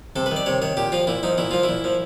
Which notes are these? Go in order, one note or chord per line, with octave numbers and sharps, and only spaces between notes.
C3 A4
B4
D#3
D5
C3 C#5
D#3 C#5
A#2 G4
F3 F4
A#2 E4
F3 D#4
A#2 E4
F3 F4
E4
A#2
F3